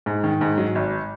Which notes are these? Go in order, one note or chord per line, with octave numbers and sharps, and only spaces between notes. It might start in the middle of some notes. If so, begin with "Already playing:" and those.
G#2
D#3
G#2
F#3
G#1